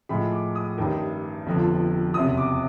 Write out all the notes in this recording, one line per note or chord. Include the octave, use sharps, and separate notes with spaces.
A2 F3 G#3 B5
D6
D#6
A1 G2 D#3
G1 F2 D3 F3
F#1 E2 C3 D#6
D6